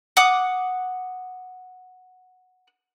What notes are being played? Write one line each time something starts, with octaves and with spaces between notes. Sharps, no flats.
F#5 D6 D#6